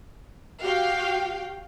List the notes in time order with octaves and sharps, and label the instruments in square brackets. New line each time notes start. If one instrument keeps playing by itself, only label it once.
[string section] F#4 G4 F5 G5